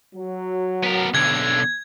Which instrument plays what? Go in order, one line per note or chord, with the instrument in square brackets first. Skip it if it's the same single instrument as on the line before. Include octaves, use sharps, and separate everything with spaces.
[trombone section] F#3
[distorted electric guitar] B3 A#4
[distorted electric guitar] B1 D3 [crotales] G#6